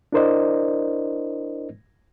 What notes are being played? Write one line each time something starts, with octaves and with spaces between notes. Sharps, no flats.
D4 E4 A#4 C5 D5 D#5